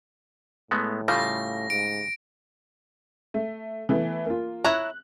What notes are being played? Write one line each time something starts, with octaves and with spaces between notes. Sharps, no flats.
A2 G#3 A3 B3
C#3 G3 A3 F4 A#6
G#2 D7
A3
E3 A3 B3
A#3 F4
E4 C#5 A#5 F#6